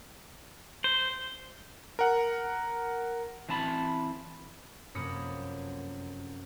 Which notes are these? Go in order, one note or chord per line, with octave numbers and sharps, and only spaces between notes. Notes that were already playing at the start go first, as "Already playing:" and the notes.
C5
A#4 F#5
E3 C4 A5 B5
F1 F#2 A#3 B5 D#6 C#7